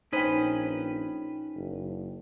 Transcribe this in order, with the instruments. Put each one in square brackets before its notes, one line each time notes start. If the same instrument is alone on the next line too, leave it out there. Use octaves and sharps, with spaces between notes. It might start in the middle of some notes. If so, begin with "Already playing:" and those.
[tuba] A#1 [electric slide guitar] C#4 B4 [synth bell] D#4 G5 [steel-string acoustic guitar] C5 A#5
[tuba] F#1